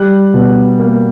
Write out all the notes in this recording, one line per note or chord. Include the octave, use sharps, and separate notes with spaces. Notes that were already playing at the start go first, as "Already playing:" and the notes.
Already playing: G3 F#6
B2
A#3